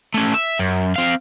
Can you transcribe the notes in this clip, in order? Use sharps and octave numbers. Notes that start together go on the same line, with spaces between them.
A3 C#4
E5
F#2
C4 F5